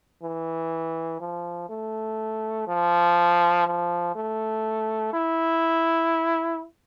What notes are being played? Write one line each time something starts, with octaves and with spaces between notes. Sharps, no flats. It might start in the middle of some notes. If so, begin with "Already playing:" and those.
E3
F3
A3
F3
F3
A3
E4